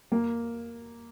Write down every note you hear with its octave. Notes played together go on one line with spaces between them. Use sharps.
A#3